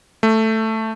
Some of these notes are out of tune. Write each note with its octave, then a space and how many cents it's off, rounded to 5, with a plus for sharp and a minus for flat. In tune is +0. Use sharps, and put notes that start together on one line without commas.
A3 +5